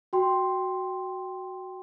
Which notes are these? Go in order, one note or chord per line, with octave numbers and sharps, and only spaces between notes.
F#4 G5 C6